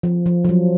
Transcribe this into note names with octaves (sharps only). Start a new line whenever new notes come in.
F3
F3
F3
F#3